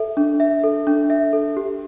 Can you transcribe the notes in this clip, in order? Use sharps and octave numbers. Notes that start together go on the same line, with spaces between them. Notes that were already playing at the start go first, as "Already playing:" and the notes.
Already playing: A4 E5
D4
E5
A4
D4
E5
A4
G4